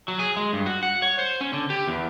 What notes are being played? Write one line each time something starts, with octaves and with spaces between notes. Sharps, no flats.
F#3
G#4
G#3
G2
F#4
F#5
C#5
C5
C#4
D3
G4
E2